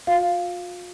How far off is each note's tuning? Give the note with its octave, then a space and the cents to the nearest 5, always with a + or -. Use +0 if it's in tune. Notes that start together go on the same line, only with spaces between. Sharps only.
F4 +40 F5 +0